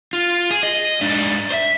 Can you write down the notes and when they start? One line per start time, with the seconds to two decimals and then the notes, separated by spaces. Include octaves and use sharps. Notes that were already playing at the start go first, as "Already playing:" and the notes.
0.13 F4
0.51 G#4
0.63 D#5
1.01 G#2 D4
1.51 C5 E5